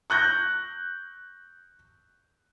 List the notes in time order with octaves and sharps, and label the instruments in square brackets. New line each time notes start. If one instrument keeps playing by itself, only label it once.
[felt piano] C#6 F#6 G6 A#6